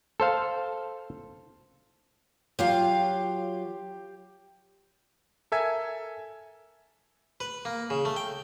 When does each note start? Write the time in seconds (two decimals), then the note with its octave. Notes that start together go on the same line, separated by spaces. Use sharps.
0.20 A4 C5 F5
2.59 F#3 F4 G4 F5
5.52 A4 A#4 E5 G#5 G#6
7.40 B4
7.65 A#3
7.90 C#3
8.05 A3
8.16 G5